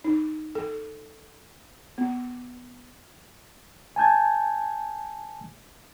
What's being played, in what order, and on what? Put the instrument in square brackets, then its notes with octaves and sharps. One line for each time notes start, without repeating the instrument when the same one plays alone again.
[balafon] D#4
A4
B3
[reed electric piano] G#5 A5 G6 G#6